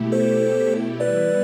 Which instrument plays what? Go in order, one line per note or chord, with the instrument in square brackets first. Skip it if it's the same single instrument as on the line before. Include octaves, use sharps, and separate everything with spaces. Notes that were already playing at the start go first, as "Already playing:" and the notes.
Already playing: [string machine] B2 A3 E4 G4
[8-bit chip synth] A4 C5
[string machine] E3 G3 B3 E4 [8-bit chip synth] B4 D5